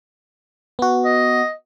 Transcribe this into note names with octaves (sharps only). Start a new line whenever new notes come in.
B3 F#4
D#5